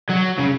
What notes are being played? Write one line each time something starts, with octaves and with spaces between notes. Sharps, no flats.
F#3
C#3